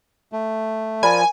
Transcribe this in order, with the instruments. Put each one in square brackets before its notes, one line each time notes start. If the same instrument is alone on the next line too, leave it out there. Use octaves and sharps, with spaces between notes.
[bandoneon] A3
[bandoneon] F3 [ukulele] A#4 D5 B5 [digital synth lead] G#5